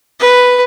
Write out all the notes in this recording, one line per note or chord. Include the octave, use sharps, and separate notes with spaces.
B4